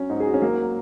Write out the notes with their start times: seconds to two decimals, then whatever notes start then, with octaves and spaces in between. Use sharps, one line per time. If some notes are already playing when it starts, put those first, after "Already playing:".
Already playing: F#3 C#4
0.09 G#2 D#4
0.20 G#4
0.26 F#4
0.34 C#4
0.42 F#3 A#3